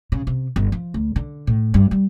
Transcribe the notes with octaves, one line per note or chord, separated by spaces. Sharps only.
C#3
C3
G1
F3
D2
D3
A2
G2
G3